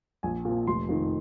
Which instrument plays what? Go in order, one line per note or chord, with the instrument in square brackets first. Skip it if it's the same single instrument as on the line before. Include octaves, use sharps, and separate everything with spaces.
[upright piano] A#1 G#5
A#2 F3
F1 C6
F2 D#3